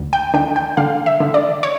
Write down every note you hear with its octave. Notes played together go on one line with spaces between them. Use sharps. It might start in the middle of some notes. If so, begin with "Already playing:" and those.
Already playing: D2
G5
D3 G5
G5
D3 F5
E5
D3
D5
C#5